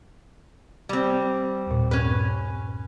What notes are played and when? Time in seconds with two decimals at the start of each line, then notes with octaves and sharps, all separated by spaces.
0.89 G3 C4
1.67 D#2 A#2
1.91 G2 C#4 B4